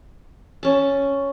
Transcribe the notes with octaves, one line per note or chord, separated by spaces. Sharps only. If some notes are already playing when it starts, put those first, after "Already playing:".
C#4 A5